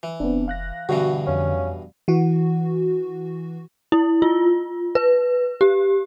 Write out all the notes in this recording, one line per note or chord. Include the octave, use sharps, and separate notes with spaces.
E3
F1 B3 C4 D4
F5 F#6 A#6
G2 B2 D3 E3 F#4
F2 C#4 F5
E3 F#4
E4
F4
B4
G4